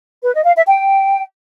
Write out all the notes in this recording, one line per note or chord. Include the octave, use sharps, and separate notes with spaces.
B4
D#5
F5
E5
G5